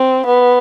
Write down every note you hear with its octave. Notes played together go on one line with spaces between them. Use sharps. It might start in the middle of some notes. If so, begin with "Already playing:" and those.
Already playing: C4
B3